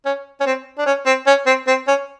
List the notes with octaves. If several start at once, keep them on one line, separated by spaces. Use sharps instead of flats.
C#4
C#4
C4
D4
C#4
C4
C#4
C4
C4
C#4